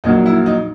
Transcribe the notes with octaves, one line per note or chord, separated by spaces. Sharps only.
A#1 A#2 F#3 D#4
E4
D#4